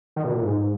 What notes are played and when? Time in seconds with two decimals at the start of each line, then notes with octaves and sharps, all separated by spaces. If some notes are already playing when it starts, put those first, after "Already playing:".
0.16 D#3
0.24 B2
0.34 A#2
0.43 G#2